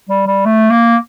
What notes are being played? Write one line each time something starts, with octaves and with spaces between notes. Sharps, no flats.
G3
G3
A3
A#3